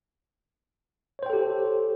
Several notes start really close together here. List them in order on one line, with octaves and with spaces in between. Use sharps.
C#5 C5 G5 A4 G4